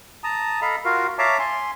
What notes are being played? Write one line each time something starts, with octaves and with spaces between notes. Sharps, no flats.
A5 A#5 D#6
A4 D#5 F5 A#5 B5
F4 F#4 A#4 F5
C#5 E5 F5 A5 A#5 D6
G#5 C6